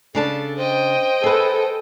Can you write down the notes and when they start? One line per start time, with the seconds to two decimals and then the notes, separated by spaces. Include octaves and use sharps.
0.15 C#3 D4 A4 A5
0.58 C5 D#5 G5
1.24 G#4 A4 B4